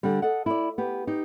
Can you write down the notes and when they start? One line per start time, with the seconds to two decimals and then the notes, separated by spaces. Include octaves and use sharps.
0.03 D3 G3
0.22 A4 D#5 F#5
0.46 E4 D5
0.78 B3 G4
1.07 D#4 G4